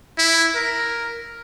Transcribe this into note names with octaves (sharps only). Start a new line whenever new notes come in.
E4
A#4